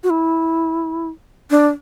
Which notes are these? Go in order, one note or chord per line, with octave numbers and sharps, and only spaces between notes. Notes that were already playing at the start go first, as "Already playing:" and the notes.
F#4
E4
D4